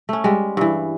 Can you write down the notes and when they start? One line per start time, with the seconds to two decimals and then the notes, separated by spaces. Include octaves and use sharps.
0.09 A3 C#4
0.24 G3 G#3
0.57 G2 E3